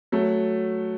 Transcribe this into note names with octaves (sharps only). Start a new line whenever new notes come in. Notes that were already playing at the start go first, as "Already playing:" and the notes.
F#3 A3